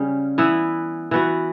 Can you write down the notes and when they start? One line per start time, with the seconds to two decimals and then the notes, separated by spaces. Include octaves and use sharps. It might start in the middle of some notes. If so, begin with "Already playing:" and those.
Already playing: C#3 G3 C#4
0.38 E3 B3 E4
1.11 E3 B3 F#4